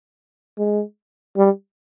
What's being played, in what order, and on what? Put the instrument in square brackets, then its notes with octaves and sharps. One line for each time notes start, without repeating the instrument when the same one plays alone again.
[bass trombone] G#3
G3